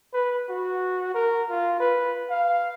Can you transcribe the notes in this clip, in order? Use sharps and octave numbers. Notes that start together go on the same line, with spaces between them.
B4
F#4
A#4
F4
B4
F5